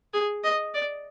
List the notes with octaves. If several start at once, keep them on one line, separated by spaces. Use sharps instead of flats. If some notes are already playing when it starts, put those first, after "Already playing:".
G#4
D#5
D5